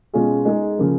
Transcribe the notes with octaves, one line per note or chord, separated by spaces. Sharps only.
B2 G#3 C#4 F4 G#4
G#3 D#4 G#4
C#3 F3 A#3